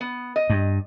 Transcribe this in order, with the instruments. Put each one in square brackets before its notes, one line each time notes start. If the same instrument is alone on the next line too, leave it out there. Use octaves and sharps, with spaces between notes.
[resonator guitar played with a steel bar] B3
D#5
[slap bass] G2